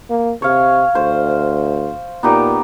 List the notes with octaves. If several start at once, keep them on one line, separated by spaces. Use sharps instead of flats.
A#3
C3 C#5 F5
D2 C5
A#2 B3 D#4 G4